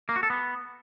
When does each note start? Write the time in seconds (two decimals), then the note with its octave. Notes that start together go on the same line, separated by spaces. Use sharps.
0.09 A#3
0.16 F#4
0.23 A4
0.30 B3